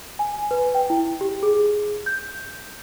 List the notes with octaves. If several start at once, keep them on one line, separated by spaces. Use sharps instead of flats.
G#5
B4
G5
E4
G4
G#4
G6